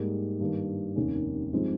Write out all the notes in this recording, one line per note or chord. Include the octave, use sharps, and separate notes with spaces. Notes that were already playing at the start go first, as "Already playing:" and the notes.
Already playing: G#2 G3 A#3
G2 D#3 A#3
F1 D#2 D#3 A#3 C#4
G2 F3 G#3 C4 D#4